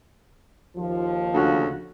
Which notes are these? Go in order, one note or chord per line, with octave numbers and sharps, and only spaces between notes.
D#2 F3
D2 C#3 F#4